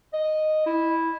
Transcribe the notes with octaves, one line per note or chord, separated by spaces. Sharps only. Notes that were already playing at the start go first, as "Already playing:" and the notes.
D#5
E4